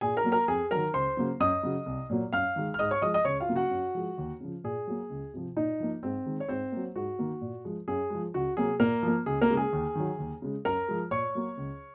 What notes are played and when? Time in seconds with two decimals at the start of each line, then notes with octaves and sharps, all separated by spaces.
0.01 A#2 G#4 G#5
0.17 A#4 A#5
0.24 F#3 A#3
0.32 A#4 A#5
0.48 F2 G#4 G#5
0.71 D#3 F#3 A#4 A#5
0.94 C#2 C5 C6
1.17 C#3 F#3 A#3
1.40 F#2 D#5 D#6
1.63 C#3 F#3
1.86 C2
2.10 A#2 F#3 A#3
2.33 F#2 F5 F6
2.56 D#3 G#3
2.74 F6
2.79 G#2 D#5 D#6
2.91 C#5 C#6
3.02 F3 G#3 D#5 D#6
3.14 D#5 D#6
3.25 C#2 C#5 C#6
3.41 F4 F5
3.48 C#3 F#3 A#3
3.56 F#4 F#5
3.71 F#2
3.95 F3 G#3
4.18 D#2
4.40 C#3 F3
4.64 A#2 G#4
4.87 F#3 A#3
5.10 C#2
5.34 C3 F3
5.57 A#2 D#4 D#5
5.80 F3 A#3
6.03 G#2 C4 C5
6.26 D#3 G#3
6.40 C#5
6.48 G#2 C4 C5
6.72 F#3 A#3
6.95 G#2 F#4
7.19 D#3 A#3
7.41 A#2
7.65 F3 G#3
7.88 F#2 G#4
8.10 F3 G#3
8.34 C#2 F#4
8.57 C3 F#3 A#3 G#4
8.80 A#2 A#3 A#4
9.03 F3 A#3
9.26 C#2 G#4
9.41 A#3 A#4
9.50 C#3 G#3
9.57 G#4 G#5
9.73 D#2
9.95 D#3 F#3
10.19 D#2
10.42 C#3 G#3
10.65 F#2 A#4 A#5
10.88 F3 G#3
11.11 A#2 C#5 C#6
11.35 F#3 A#3
11.57 C#2